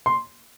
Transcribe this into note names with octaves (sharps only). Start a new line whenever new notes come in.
C6